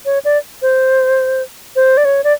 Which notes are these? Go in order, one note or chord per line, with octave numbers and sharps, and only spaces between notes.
C#5
D5
C5
C5
D5
C#5
D5